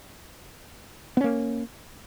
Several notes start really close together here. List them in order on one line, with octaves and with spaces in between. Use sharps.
B3 C#4 A#3